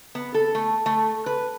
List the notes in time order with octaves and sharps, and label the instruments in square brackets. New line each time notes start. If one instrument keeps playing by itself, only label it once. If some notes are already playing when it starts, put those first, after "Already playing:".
[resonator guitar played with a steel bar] B3
A4
A3
A3
B4